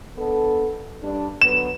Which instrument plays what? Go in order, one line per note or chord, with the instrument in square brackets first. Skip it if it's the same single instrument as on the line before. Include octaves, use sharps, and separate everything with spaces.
[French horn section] B3 D4 A4
G2 D4
[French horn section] D3 F#3 B3 [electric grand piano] E7